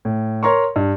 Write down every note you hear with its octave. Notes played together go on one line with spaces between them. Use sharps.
A2
A#4 C#5 A#5 C6 C#6
G2